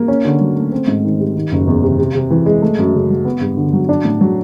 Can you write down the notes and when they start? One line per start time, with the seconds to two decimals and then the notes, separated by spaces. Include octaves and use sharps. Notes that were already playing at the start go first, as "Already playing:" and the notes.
Already playing: A#3
0.08 C#4
0.25 D3
0.40 F#3
0.56 A3
0.72 C4
0.88 G#2
1.04 D#3
1.19 G3
1.35 D#3
1.52 F#1
1.67 E2
1.83 C3
1.99 C3
2.15 C3
2.31 E3
2.46 G#3
2.62 A3
2.78 F#2
2.95 C#3
3.10 F#3
3.25 B3
3.41 G2
3.57 D3
3.73 F#3
3.89 D4
4.05 A2
4.21 F#3